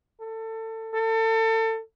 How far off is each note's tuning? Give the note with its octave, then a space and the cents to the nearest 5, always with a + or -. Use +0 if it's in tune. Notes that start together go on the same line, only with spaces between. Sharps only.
A4 +25
A4 +30